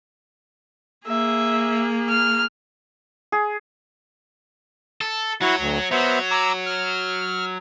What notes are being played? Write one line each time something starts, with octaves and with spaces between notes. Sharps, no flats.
A#3 G#4 E5
F6
G#4
A4
F#3 E4 F#4 F#5
D2
F#3 B3 C5 E5
A#5 D6 E6
F6